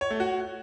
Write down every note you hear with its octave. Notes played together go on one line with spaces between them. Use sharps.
C#5
A3
F#4